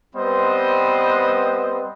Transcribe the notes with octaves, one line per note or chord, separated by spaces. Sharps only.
G3 B3 C4 B4 C5 D#5